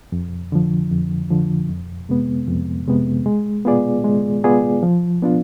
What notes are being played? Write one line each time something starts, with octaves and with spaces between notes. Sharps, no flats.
F2
D3 F3
F2
D3 F3
F2
C3 G#3 B3
F2
C3 G#3 B3
G#3
B3 F4 G#4 D5
G#3
B3 F4 G#4 D5
F3
B3 D4 F4